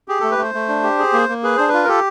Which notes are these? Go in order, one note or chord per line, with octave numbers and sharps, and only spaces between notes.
G4 G#4
A3 A4
B4
A3 C5
A3
D4
G4
G#4
A#3
A#3
G#4 B4
D4 C5
F4 B4
A#4
G4 A4